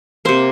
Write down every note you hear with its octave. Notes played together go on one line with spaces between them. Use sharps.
C3 A#3 C5